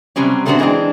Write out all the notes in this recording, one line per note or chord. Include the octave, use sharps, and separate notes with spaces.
C3 F#3 G3 C4 C#4
A#2 A3 B3 C4 D4 F#4
E3 G#3 B3 C4 D4